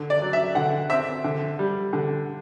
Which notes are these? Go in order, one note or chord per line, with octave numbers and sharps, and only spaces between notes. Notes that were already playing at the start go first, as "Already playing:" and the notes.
Already playing: D3
D5
F#3
E5
D3 F#5
C4 E5
D3
G3
D3